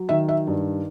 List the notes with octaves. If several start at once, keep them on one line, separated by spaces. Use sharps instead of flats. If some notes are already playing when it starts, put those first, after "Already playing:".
Already playing: F#3
D#3 E5
E5
G2